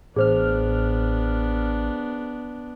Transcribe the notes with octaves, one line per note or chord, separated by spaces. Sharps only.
A1 B3 D4 G#4 C5 F6